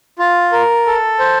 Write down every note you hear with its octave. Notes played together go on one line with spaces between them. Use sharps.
F4
A#4
A4
C5